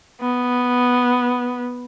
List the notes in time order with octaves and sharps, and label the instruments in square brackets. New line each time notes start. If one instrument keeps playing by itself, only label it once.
[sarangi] B3